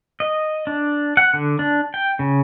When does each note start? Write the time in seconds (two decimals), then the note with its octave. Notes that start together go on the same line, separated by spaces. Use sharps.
0.20 D#5
0.67 D4
1.17 F#5
1.34 D3
1.59 D4
1.94 G5
2.19 C#3